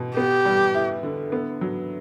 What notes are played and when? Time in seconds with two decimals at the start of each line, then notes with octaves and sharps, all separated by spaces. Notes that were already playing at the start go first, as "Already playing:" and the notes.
Already playing: B2
0.17 B3 G4
0.45 G3
0.74 E4
1.03 D3
1.32 B3
1.61 F#3